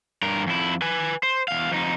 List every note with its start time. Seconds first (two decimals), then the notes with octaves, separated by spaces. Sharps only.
0.22 G2 A#4
0.47 F2 E4
0.82 B4 G#5
1.23 C5
1.48 E2 F5
1.72 F2 D#4